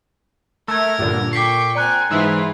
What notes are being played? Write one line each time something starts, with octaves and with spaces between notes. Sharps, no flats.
A3 A#4 E6 G#6
G2 A#2 D3
A4 G5 C#6 D6 B6 C7
C4 D5 G#5 A#5 F#6
G#2 E3 B3 E4 F4 G#4